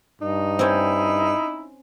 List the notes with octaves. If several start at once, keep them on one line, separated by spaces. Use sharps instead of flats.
G2 D#4
C4 C#4 E4